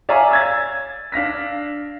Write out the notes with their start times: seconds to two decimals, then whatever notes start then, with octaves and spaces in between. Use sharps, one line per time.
0.09 C#5 D5 E5 F5 G#5 A#5
0.31 E6 G#6 A6
1.12 D4 F5 A#6 B6